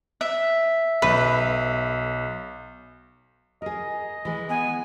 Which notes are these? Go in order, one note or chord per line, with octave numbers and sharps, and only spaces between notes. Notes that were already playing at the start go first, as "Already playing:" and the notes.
E5
B1 B4
G#4 A#4 D#5
E3 G#3
B3 G#5